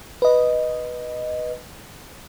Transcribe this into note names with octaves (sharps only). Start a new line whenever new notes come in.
B4 D#5